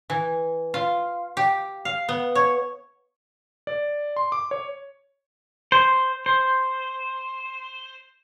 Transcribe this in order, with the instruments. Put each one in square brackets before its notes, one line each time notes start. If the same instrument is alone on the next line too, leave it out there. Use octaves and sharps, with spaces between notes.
[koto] E3
F4
G4
F5
B3
C#5
[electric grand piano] D5
C6
D6
C#5
[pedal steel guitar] C5
C5